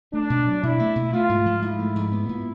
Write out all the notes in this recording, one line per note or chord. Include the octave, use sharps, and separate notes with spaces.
A3 D4
B2
F#3
B2 E4
A3
B2
A3 F4
G#2
F3
G#2 E4
A3
G#2
B3
A#2